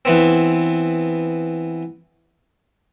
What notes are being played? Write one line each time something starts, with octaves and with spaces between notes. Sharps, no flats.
E3 B3 C4